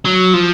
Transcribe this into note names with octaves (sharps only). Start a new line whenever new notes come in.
F#3
F3